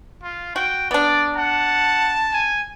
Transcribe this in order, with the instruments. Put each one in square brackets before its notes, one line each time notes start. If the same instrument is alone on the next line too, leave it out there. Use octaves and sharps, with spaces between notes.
[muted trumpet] F4
[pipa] F#4 [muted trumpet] G5
[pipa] B3 D4 [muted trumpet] D5
[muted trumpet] F#5 [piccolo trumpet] A5
[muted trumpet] G#5